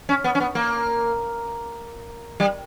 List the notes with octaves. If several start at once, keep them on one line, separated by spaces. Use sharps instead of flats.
C#4
B3
C#4
B3
A#3
G3